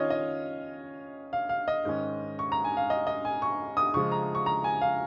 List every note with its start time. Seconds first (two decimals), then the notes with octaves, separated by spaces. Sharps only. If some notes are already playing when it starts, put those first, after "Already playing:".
Already playing: D#3 C#4 F4 C#5 D#5 F5
0.10 D#5
1.33 F5
1.49 F5
1.68 D#5
1.85 G#2 D#3 G#3 C#4
2.39 C#6
2.52 A#5
2.64 G#5
2.77 F5
2.90 D#5
3.07 D#5
3.25 G#5
3.42 C#6
3.77 D#6
3.94 C#3 F3 G#3 C#6
4.12 A#5
4.35 C#6
4.46 A#5
4.64 G#5
4.81 F5